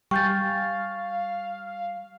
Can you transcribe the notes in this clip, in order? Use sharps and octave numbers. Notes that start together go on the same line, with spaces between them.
G3 F5 G5 G#5 C#6 G6 A6